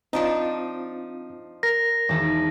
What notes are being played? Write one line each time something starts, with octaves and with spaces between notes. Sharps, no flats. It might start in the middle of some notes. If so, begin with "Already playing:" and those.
F3 C4 D4 D#4 F4
A#4 A#6
E1 D#3 A5